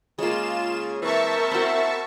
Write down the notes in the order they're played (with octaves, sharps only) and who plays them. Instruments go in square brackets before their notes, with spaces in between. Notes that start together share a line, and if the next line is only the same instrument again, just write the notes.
[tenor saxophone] C#3 [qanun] G#3 A#3 [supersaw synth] F4 E7
[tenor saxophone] E3 [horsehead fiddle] C4 A#4 [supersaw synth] E5 A5 C#6
[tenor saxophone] E4 [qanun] F#4 C5